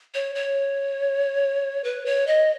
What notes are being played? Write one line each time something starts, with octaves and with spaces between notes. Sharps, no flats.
C#5
C#5
B4
C#5
D#5